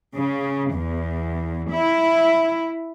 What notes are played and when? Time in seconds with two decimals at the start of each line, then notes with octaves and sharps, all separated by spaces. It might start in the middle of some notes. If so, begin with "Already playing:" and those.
0.14 C#3
0.72 E2
1.70 E4